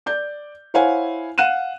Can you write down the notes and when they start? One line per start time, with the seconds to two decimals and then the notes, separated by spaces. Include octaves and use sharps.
0.06 D5 G6
0.74 E4 C5 C#5 F5 F#5 G#5
1.38 F5 F#5 F#6 D#7 E7